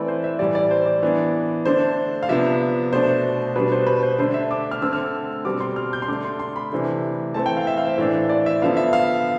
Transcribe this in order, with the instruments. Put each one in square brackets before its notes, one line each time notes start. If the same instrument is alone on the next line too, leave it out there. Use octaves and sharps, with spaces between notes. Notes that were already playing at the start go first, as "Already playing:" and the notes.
Already playing: [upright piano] E3 A3 C4 B4 D5
C5
E5
A2 E3 G3 D5
D5
C5
D5
E3 B3 D4
D3 A3 D4 C5
F5
C3 F3 B3 D4 E5
B2 A3 D4 C5
B2 G3 D4 B4
C5
B4
C5
D3 A3 D4 C5
E5
D6
F6
D3 A3 C4 E6
F6
B2 G3 C4 D6
C6
F6
G6
C6
D3 A3 D4 D6
C6
C6
B5
C3 E3 A3 D4
E3 A3 C4 A5
G5
F5
E5
F5
C5
A2 E3 A3 D4
D5
E5
D3 F3 B3 F5
E5
F5